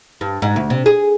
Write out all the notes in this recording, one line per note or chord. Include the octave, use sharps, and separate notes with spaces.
G2
G#2
D2
C3
G#4